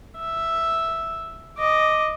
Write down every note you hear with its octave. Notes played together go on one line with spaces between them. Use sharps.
E5
D#5 D6